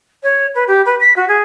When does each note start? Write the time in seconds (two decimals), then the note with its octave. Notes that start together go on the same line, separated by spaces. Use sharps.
0.23 C#5
0.54 B4
0.67 G4
0.85 B4
1.00 B6
1.16 F#4
1.28 G#4